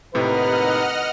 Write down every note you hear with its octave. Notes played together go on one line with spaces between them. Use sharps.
D#2 A2 C3 D#4 B4 D#5 F#5 F6